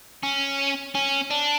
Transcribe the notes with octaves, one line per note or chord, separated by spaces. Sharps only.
C#4
C#4
D4